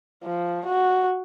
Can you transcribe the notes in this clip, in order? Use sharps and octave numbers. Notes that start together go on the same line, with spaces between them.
F3
F#4